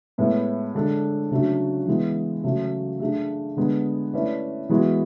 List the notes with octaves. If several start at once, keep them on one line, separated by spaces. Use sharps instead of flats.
A2 G#3 B3 E4 B4
D3 G#3 D4 A4
C#3 F#3 A3 D4
E3 G#3 B3
C#3 F#3 A3
A3 D4 G#4
D3 G#3 B3
A3 C#4 E4 B4 D5
E3 G#3 B3 F#4